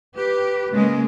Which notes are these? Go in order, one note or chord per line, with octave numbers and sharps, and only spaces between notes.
G4 B4
C#3 G#3 A#3